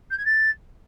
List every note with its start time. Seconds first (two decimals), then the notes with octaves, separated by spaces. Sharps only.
0.11 G6
0.18 G#6
0.25 A6